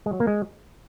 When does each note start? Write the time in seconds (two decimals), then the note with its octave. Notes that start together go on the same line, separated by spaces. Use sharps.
0.06 G#3
0.13 F#3
0.20 A#3
0.27 G#3